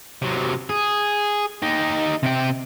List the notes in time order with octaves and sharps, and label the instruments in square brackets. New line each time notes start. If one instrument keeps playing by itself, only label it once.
[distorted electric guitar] C3 F#3
G#4
D#4 G4
C3 G5